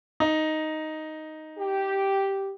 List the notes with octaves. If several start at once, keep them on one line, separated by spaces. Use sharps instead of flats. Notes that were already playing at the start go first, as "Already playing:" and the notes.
D#4
G4